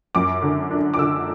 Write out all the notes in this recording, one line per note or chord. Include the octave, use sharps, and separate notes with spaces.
F#2 D6
D3
D4
D6
D3 E6